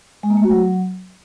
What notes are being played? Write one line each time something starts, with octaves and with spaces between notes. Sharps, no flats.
G#3
A#3
A3
F#4
F#3